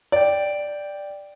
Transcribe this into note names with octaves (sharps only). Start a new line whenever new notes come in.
D5 G5